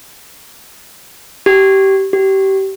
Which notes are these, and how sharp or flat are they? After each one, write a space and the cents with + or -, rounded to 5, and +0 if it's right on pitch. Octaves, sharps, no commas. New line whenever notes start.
G4 -20
G4 -25